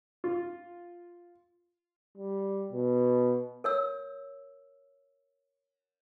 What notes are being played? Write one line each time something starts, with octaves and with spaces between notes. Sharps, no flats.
F4
G3
B2
A#4 C#5 E6